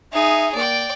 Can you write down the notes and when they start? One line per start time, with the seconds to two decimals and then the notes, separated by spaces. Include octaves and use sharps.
0.13 D#4 G#4 E5
0.54 A#3 D5 G5